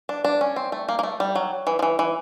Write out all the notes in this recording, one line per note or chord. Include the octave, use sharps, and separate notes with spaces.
D4
D4
C#4
C4
A3
A#3
A#3
A3
G3
F#3
E3
F3
E3
E3